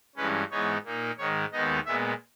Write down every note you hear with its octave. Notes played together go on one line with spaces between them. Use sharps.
G2 E3 G#3 C#4 B4
G#2 E3 G#3 B3 D#4 C#5
A#2 A#3 D#4
G#2 D#3 G#3 C#5
D#2 D#3 G#3 B3 D#4 D#5
A#2 G#3 B3 E5